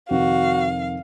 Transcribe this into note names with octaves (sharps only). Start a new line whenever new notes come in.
F2 C3 D#3 F#4 F5